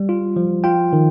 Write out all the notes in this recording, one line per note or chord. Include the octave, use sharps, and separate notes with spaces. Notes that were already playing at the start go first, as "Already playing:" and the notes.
Already playing: G3
F4
F3
F4 G5
D#3